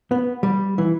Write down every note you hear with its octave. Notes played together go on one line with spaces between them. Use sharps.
B3
G3
E3